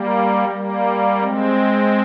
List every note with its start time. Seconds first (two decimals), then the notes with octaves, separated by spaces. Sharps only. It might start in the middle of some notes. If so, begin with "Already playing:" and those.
Already playing: G3 A#3
0.49 G3 A#3
1.19 G#3 C4